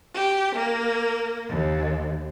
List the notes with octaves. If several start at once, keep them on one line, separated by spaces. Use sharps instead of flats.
G4
A#3
D#2